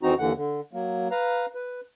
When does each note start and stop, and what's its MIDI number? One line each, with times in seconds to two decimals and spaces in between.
0.03 0.14 41
0.03 0.14 52
0.03 0.14 60
0.03 0.14 63
0.03 0.14 66
0.03 0.14 82
0.19 0.33 39
0.19 0.33 50
0.19 0.33 52
0.19 0.33 78
0.36 0.60 50
0.73 1.08 54
0.73 1.08 58
1.11 1.46 71
1.11 1.46 77
1.11 1.46 82
1.55 1.81 71